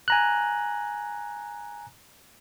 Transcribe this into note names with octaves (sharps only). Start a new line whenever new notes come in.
G#5 A#5 F#6